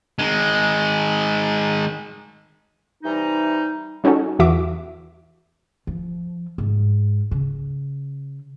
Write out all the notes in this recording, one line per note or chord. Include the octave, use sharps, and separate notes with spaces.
D#3 G#3
C3 E3 G3 D#4
G3 C#4 D#4 F#4 A4
E2 E3 F#4 E5 D6
F3
G#2
C#3